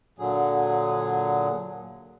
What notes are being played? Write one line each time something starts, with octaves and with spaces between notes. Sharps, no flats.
A#2 D3 F#3 G#4